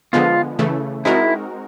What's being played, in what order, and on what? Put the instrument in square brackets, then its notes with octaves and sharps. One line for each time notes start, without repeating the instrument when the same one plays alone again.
[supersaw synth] D3 F3 G#3 B3 [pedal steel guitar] F4
[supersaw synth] C#3 E3 A3
[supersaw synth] G#3 C4 D#4 F#4 A#4 [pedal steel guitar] E4